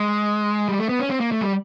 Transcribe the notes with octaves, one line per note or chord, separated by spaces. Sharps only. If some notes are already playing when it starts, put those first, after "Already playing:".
Already playing: G#3
G3
A3
B3
C#4
C4
A#3
A3
G3